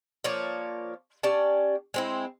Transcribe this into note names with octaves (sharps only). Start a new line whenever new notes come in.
F3 A#3 C#5 D5
C#4 G4 D5 A5
G#3 C4 E4